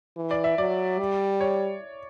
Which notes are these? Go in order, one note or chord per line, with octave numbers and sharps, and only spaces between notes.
E3
D5
E5
F#3 D5
G3
C#5